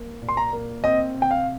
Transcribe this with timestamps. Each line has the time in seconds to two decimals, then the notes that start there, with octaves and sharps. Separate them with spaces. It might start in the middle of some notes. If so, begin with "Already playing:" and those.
Already playing: A#3
0.22 A#2
0.29 C6
0.37 A#5
0.53 A#3
0.84 C4 D#5
1.14 C3
1.22 G5
1.31 F5